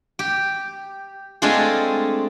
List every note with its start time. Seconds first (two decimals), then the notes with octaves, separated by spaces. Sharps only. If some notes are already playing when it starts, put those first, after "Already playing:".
0.19 G4
1.42 G#3 A3 C4 D4 F4 G#4